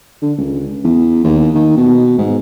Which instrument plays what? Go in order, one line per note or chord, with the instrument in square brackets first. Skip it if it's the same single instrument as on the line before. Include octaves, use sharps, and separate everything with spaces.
[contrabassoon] D3
C#2
E2
D#2
D#3
B2
G#2